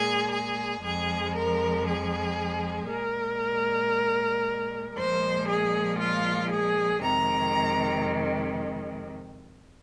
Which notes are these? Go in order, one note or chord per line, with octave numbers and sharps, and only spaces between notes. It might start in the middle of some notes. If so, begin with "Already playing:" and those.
Already playing: A#2 G#3 G#4
G#4
F2 F3 G#3 G#4
A#4
G#4
A#2 G#3 A#4
A#2 F3 G#3 C5
G#4
F4
G#4
F2 C3 D#3 G#3 A#5